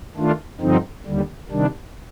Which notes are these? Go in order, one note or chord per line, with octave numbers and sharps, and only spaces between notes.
D#3 A3 D4 F4
G2 D3 F3 C4 D#4
D#2 D3 G3
C3 D#3 G3 D4